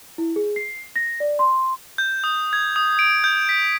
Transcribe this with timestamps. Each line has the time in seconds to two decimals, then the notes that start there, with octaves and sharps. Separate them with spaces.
0.18 E4
0.36 G#4
0.56 C7
0.96 A#6
1.20 D5
1.39 C6
1.98 G6
2.24 D#6
2.53 G#6
2.76 D#6
2.99 D7
3.24 G6
3.49 B6